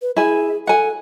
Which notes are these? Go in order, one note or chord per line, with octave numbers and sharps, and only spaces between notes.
B4
E4 G#4 G#5
A4 F#5 G#5